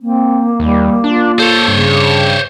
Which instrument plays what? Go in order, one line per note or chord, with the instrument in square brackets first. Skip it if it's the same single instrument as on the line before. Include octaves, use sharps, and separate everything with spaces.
[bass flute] A#3 [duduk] C4
[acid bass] D#2 [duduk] G3
[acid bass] D4 [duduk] F4
[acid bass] A4 [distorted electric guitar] C5 C#5
[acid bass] G2 [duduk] C#3